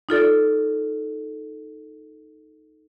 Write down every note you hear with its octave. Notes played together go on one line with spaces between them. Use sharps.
D#4 F4 A4 D5